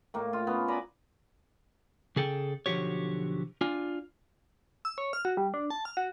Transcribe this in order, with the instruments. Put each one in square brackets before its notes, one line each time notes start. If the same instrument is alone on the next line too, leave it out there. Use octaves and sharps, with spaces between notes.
[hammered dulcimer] A2 A#3
F4
B3 C#4
D5 G#5 A#5 B5
[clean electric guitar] C#3 G#4 A4 G5
B1 D3 F3 F#4 G4 C#5
D4 F4 G#5
[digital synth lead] E6
C#5
F6
F#4
G3
D4
A5
F6
F#4